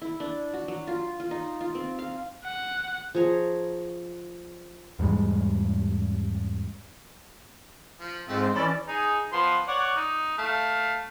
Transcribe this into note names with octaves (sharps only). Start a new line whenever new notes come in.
E4
D4
F#4
F#3
F4
F4
D#4
F4
C4
F5
F#5
F3 G#4 C#5 A#5
E2 G#2 G3 G#3
F3
G#2 F3 G#3 A3 C4
C5
E3 C#4 A4 D5 B5
D#4 G#4
F3 B3 C6
C#5 D5 F#5
D#4
A3 F5